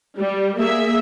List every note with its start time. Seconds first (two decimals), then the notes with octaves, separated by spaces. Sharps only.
0.18 G3
0.59 A#3 G#4 E5